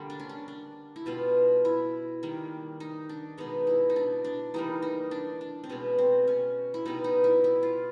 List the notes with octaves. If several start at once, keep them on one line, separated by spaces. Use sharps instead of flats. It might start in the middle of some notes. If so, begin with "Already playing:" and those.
Already playing: D3 G3 A#3
D4
C#4
D4
D4
E4
B2 G3 B3 F4
E4
D#3 G3 A#3
D#4
D4
B2 G#3 B3 D#4
E4
D#4
D4
D4
E3 G3 A#3 D#4
D#4
D4
D4
C4
B2 G#3 B3 C#4
C4
C#4
E4
B2 G3 B3 D#4
D#4
E4
E4
F4